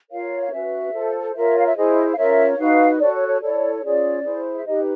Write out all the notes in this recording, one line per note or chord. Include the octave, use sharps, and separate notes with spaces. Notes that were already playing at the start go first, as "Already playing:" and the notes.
F4 A#4 C#5 F5
F5
C#4 F#4 B4 E5
F4 A4 C5
F4 A#4 C#5 E5
F5
E5
E4 G#4 C5 D#5
F5
C#4 F4 A#4 C#5 E5
D#4 F#4 B4 F5
F#4 A4 C#5 D5
C#5
C#5
E4 A4 C#5 D5
C#4 F4 G#4 C#5 D5
E4 G#4 C5
E5
D#4 G4 B4 D#5